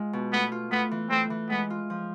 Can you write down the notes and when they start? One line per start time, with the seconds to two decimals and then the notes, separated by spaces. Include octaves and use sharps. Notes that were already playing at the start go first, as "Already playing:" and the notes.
Already playing: G#3 F4
0.13 B2
0.33 A3 B3
0.52 F4
0.71 A3 B3
0.91 E3
1.11 A3 C4
1.30 E3
1.50 G#3 B3
1.70 F4
1.90 F3